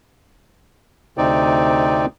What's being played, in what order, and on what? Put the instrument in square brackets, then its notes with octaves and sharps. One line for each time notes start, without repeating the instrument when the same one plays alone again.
[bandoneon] D2 C3 C4 D#4 D5